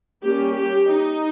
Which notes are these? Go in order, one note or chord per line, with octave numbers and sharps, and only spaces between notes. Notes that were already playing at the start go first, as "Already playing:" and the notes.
G3 A#3 C#4 G4
G4
D#4